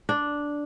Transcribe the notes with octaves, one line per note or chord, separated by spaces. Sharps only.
D4